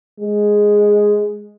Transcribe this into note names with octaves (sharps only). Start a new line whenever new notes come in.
G#3